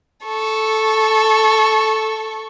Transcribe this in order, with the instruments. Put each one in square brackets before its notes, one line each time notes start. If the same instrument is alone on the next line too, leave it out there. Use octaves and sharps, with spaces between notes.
[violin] A4 C#6